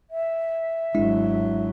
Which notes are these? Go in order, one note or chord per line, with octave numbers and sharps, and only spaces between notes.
E5
G#1 F#3 G#3 D4 E4